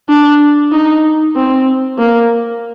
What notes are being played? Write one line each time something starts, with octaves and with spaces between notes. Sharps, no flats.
D4
D#4
C4
A#3